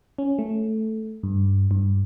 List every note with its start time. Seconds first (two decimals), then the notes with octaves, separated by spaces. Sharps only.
0.18 C#4
0.39 A3
1.23 G2
1.71 G2